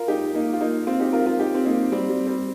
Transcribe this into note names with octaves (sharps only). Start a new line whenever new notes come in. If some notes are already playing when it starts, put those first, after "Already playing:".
Already playing: F4 A#4
D#4 G4
A#3 D#4
F4
A#3 D#4
C4 F4
D#4 G4
F4 A#4
F4 A#4
D#4 G4
C4
A#3 D#4
G3 C4
G3
G3 C4